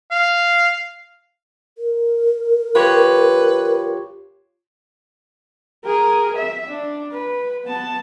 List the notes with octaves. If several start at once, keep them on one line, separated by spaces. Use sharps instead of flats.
F5
A#4
F4 G4 B4 C#5
G#4 A#4
E5
D4
B4
B3 A5